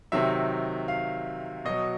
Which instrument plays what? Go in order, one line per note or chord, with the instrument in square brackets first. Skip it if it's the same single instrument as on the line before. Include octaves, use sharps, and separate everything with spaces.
[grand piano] C3 D#3 F#3 E5
F5
B2 F#3 D#5